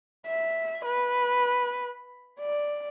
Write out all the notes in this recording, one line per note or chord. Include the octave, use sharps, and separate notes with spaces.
E5
B4
D5